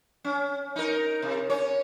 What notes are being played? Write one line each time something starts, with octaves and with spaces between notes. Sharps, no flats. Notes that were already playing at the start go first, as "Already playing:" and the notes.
C#4
D#4 A#4
C3
C#4 C#5